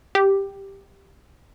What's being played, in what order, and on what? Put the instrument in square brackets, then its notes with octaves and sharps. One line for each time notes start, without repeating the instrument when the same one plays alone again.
[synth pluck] G4